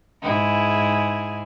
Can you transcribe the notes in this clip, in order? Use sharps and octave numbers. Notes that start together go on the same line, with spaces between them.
G#2 E4 G#4